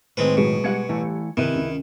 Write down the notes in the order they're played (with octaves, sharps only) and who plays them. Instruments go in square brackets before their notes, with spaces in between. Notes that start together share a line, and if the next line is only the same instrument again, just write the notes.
[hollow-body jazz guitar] A2 D#3 [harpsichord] G#3 C4 B4
[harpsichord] B2 [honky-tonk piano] F#3 G#3 G#4
[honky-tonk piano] G3 G#6 C#7 [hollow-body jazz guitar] G#3 F5 F#5
[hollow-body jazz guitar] E3 A3 E4
[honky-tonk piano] C3 D#7 [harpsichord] D#3 [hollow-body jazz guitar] E4 B4
[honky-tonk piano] C#2